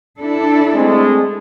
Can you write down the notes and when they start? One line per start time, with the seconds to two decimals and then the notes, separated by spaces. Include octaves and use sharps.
0.20 D4 E4 A4
0.74 G#3 A3 C4